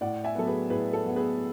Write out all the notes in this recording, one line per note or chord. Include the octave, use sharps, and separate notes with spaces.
A2 D5 F#5
E5 G#5
F#3 B3 A4
G#4 B4
A2 G#4 B4
A4
F#3 B3
G#4 B4